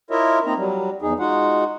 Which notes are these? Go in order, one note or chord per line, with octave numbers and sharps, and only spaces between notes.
E4 F4 A#4 C#5 D#5 E5
A#3 C4 D#4 A#5
F#3 G3
E2 D#4 G#4
G#3 D#4 F4 F#4 F#5